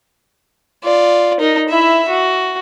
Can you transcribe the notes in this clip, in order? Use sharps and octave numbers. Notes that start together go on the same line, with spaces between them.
F4 D5
D#4 A#4
E4 E5
F#4